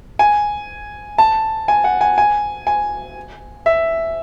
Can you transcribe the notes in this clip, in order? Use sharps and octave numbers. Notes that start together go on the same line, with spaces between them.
G#5
A5
G#5
F#5
G#5
G#5
G#5
E5